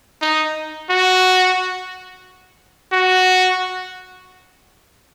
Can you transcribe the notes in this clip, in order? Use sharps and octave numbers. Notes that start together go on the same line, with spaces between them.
D#4
F#4
F#4